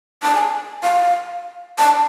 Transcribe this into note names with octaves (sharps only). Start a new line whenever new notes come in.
A5
G#5
F5
A5